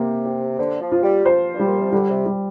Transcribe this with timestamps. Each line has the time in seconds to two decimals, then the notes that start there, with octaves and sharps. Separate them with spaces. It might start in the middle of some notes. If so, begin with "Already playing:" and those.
Already playing: C3 A#3 G4
0.25 G4
0.59 D3 C5
0.81 F3
0.92 F4
1.03 G3
1.25 F3 C5
1.53 G2
1.59 G3
1.66 A#2
1.80 C3
1.92 D3 G3
2.09 C3
2.26 G3